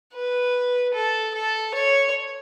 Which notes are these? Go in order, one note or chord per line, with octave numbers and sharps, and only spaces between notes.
B4
A4
A4
C#5